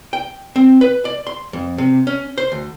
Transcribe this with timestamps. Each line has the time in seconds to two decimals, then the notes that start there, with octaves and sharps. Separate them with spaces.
0.13 G5
0.56 C4
0.81 B4
1.05 D5
1.27 C6
1.53 F2
1.78 C3
2.07 C#4
2.38 C5
2.52 D2